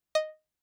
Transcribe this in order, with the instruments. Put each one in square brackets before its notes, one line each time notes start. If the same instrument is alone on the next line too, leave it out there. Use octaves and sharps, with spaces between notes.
[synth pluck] D#5